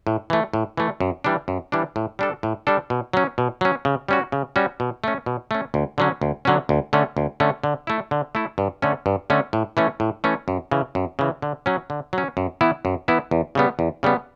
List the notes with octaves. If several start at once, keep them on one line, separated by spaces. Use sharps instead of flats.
A2
E3 A3
A2
E3 A3
F#2
E3 G3 D4
F#2
E3 G3 D4
A2
G3 D4 A4
A2
G3 D4 A4
B2
F#3 C#4
B2
F#3 C#4
C#3
G3 C#4 F#4
C#3
G3 C#4 F#4
B2
A3 C#4
B2
A3 C#4
D2
D3 F#3 C#4
D2
D3 F#3 C#4
D2
D3 A3 C#4
D2
D3 A3 C#4
D3
A3 E4
D3
A3 E4
G2
D3 A3 C#4
G2
D3 A3 C#4
A2
E3 A3 C#4
A2
E3 A3 C#4
F#2
C#3 E3
F#2
C#3 E3
D3
F#3 C#4
D3
F#3 C#4
F#2
E3 B3 E4
F#2
E3 B3 E4
E2
C#3 G3 B3
E2
C#3 G3 B3